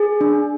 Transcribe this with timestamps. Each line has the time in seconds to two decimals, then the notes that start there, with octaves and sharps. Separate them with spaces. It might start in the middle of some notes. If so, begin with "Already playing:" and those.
Already playing: G#4
0.21 D4